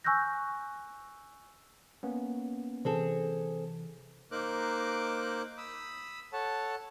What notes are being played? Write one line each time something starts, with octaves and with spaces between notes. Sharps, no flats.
G#5 C#6 E6 F#6 G6 A#6
A#3 B3 C#4
C3 E3 C4 G#4 A4
A#3 D#4 A#4 C5 D6 F#6
B5 D#6 E6
A4 C#5 F#5 A5